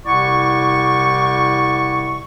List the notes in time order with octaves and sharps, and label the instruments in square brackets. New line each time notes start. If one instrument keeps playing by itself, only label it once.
[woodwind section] C2 C3 E4 D5 F#5 C#6